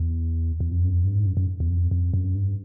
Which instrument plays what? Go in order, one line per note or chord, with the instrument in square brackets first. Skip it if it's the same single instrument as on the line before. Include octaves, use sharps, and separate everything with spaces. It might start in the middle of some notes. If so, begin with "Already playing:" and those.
Already playing: [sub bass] E2
E2
F2
F#2
F2
G2
G#2
F#2
F#2
E2
F2
F2
F#2
G2